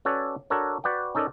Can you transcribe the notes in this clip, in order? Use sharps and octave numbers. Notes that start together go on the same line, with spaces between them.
C#4 F#4 A4 B4 C#5 D5
D4 F#4 A4 A#4 C#5
F#4 B4 D5 F#5 G5
C#4 D#4 A4 A#4 D5